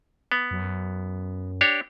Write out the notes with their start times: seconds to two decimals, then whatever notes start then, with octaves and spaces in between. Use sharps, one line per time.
0.32 B3
0.51 F#2
1.61 D4 G4 C#5